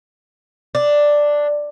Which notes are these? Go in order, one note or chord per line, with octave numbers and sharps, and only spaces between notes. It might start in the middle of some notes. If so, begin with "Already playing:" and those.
D4